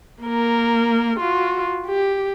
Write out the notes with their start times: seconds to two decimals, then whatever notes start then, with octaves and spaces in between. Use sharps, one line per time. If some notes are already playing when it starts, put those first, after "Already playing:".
0.23 A#3 A#4
1.20 F4 F#4
1.87 G4